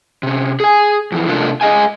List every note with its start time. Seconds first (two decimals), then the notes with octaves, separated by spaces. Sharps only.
0.23 C3 C#4
0.60 G#4 G#5
1.12 F2 E3
1.28 C3 A3 D4 F4 A#4
1.61 G#4 D#5 F5 G#5